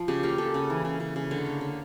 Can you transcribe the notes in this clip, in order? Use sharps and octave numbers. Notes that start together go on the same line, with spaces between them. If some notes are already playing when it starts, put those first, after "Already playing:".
Already playing: F3
C#3 G4
A#3 G4
C#3 A4
C#3
E3
C#3
C#3
C#3
D3 C#5
A#3
D3